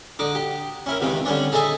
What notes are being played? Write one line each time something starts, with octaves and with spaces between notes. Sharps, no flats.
D3 D#4 D6
G4
C#4 E4 A#4
C#2 C3 D#3 E3 C4
D3 G3 C#4 D4
D#4 G#4 A4 D#5 E5 G#5